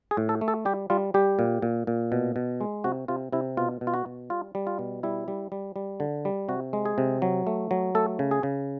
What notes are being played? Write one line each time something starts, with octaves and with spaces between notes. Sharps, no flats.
G#4
A2
A4
A3
A4
G3 G4
G3 F4
G3 G4
A#2
A#2
A#2
B2
B2
G#3
C3 F#4
C3 F4
C3 E4
B2 F4
B2
F4
F#4
B2
G3 F4
G3
F4
B2
G3 E4
G3
G3
G3
D3
G3
C3 F#4
G#3
G#4
C3
F#3
A3
F#3
A3 A4
C#3
G#4
C#3